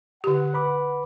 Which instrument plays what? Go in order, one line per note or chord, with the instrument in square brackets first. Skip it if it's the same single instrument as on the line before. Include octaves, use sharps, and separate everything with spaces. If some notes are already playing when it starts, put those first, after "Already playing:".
[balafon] D3 G4 [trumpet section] F#5
[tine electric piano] B4 B5 D6